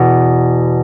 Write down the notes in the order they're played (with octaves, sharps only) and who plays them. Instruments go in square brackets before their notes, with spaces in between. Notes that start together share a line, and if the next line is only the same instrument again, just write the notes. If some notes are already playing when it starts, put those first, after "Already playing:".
Already playing: [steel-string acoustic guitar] E2 B2